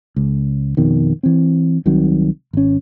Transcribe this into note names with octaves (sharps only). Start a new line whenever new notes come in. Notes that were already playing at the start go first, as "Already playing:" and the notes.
C#2
F2 B2 D#3
E3 C4
C2 C3 D#3 F#3
G#1 C#4